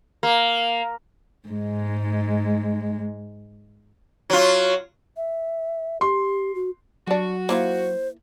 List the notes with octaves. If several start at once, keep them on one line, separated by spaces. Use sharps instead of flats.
A#3
G#2 G#3
F#3 F4
E5
G4 C6
F#4
F#3 G3 D4 F#4
A#3 E4 F4 C5